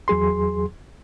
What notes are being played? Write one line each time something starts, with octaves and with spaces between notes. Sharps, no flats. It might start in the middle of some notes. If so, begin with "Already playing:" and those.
E2 F#3 G#4 C6